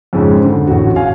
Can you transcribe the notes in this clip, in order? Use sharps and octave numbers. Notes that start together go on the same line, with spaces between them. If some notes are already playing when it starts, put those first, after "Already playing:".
F2 G#2 C#3 G#3
D3
A1 F#4
F5 G#5